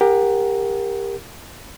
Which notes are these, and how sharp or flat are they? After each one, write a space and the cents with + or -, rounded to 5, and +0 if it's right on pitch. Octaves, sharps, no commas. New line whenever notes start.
G4 +25 A#4 +0 F#5 +0